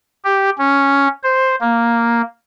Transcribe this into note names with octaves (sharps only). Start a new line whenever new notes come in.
G4
C#4
C5
A#3